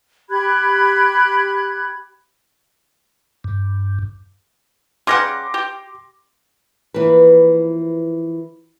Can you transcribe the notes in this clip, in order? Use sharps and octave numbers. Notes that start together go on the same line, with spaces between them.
G4 B5 F#6 G#6
G2
C#3 G3 F#5 C6 D6 A#6
G4
E3 F3 A#3 B4